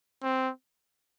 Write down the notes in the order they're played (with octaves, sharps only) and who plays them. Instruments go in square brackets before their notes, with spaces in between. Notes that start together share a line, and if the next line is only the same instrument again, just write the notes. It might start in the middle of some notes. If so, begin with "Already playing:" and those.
[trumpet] C4